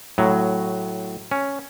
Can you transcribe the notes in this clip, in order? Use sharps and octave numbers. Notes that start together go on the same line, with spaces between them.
A2 F#3
C#4